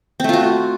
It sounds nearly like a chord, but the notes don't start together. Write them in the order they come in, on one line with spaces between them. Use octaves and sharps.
C4 A3 F4 F#4